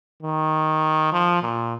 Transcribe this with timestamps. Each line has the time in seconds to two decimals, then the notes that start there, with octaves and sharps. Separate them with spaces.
0.23 D#3
1.13 F3
1.42 A#2